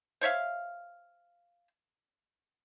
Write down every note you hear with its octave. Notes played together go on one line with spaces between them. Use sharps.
C5 C#5 E5 F5